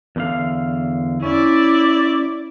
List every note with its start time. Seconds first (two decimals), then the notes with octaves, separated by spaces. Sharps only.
0.16 E2 D3 F5
1.22 C#4 E4 D5